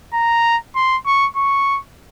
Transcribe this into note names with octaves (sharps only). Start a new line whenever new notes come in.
A#5
C6
C#6
C#6